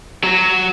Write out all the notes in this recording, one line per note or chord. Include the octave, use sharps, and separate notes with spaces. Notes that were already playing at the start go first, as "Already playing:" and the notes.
F#3